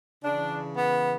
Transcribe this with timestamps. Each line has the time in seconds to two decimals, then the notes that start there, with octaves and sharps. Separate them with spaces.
0.24 C#3 E3 D4
0.77 B3